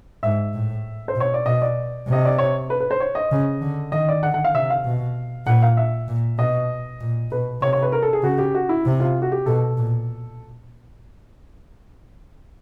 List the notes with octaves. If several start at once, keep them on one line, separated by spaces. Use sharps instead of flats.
G#2 E5
A2
C5
B2
C#5
D5
B2 D#5
D5
C3 D#5
D5
C#5
B4
B4
C5
C#5
D#5
C#3
D3
D#3 D#5
D5
D3 F#5
F#5
F5
C3 E5
F5
B2
A#2 F#5
F5
E5
A#2
B2 D#5
A#2
B2 B4
C3 C#5
C#5
B4
A#4
A4
G#4
C#3 F#4
G4
F#4
E4
C3
F4
F#4
G4
B2 A4
A#2